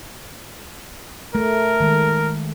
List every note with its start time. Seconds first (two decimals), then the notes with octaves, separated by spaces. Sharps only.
1.35 A3 A#4
1.80 D#3 G#3